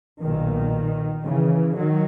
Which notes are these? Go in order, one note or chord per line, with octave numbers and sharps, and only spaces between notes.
B1 A#2 D#3
C#3 E3
D#3 F#3